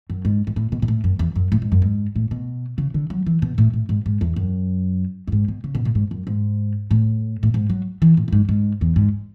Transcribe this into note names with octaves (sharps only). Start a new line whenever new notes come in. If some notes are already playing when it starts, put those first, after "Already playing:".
F#2
G#2
G#2
A2
B2
B2
A2
F#2
E2
F#2
A2
G#2
F#2
G#2
A2
B2
C#3
D3
F#3
E3
B2
A2
A2
G#2
G#2
E2
F#2
F#2
G#2
B2
C#3
B2
A2
G#2
F#2
G#2
A2
A2
G#2
F#3
E3
A2
F#2
G#2
G#2
E2
G#2